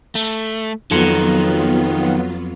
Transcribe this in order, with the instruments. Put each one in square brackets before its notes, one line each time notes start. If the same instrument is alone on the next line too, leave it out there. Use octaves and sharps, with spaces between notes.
[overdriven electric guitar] A3
[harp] F2 C#7 E7 [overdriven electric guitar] D#3 [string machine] F#3 B3 F4